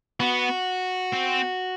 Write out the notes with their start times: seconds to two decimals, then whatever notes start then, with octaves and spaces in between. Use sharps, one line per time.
0.20 B3 F#4
1.13 C4